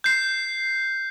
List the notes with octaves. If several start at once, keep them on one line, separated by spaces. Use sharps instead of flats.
G6 C7